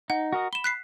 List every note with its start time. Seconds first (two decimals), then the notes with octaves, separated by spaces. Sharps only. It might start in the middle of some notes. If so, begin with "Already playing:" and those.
0.10 D#4 F#5
0.33 F#4 A#4 D#5
0.53 B5 E7 G7
0.64 F#6 B6 C7